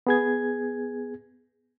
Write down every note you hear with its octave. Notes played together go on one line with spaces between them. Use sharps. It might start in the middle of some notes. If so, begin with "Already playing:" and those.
B3 G#4 G#6